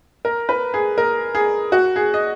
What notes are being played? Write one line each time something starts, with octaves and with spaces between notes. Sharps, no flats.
A#4
B4
G#4
A#4
G#4
F#4
G#4
D#5